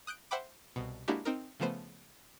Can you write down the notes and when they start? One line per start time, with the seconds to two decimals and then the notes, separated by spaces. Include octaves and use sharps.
0.07 D#6 F#6 G6 D7
0.31 C5 E5 F#5 G5 B5 D6
0.76 C2 B2
1.08 G#3 A#3 D4 E4 F#4 G4
1.25 C4 D#4 A#4
1.60 C#3 F3 A3 B3 C5